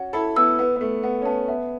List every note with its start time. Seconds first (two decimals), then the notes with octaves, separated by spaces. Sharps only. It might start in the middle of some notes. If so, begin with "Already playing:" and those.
Already playing: C#4 F#4 F#5
0.13 E4 A4 B5
0.36 B3 E4 E6
0.59 B3 B4
0.76 B3
0.81 A3 B4
1.03 B3 F#5
1.22 C#4
1.25 B3 A5
1.48 B3 E5